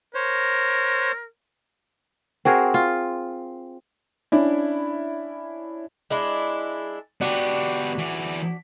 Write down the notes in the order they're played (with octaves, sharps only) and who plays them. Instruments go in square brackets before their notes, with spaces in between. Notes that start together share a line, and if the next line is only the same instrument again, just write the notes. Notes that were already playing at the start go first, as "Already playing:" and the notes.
[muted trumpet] A#4 [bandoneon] C5 C#5
[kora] C4 F#4 G#4 A#4
F4
[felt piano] C#4 D4 E4
[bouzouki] G#3 D4 E4
[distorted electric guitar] B3 G4 [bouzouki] D4 F#4
[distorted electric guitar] E3 D5